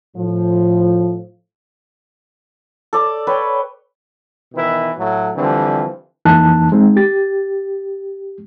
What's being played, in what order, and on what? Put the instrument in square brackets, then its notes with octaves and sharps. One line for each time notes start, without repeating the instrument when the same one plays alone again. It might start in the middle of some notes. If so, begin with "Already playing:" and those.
[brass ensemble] A2 F3
[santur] A4 D5
B4 C#5 G5
[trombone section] B2 D#3 E3 E4 B4
A2 F#3 A3
D3 E3 F3 G3 C4
[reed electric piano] F2 E3 A#3 D#4 A5 F#6
G#3 C4 D#4
G4 A6